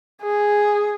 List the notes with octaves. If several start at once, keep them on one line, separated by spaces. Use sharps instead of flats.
G#4